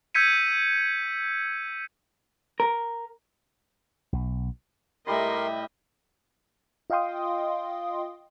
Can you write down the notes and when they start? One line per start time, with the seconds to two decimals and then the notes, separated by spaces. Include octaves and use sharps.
0.15 E6 G6 G#6 B6 C#7 D#7
2.60 A#4
4.13 B1
5.07 A2 G3 A#4 D#5 E5 B5 C6
6.90 F4 D#5 F5 G5 C6 D#6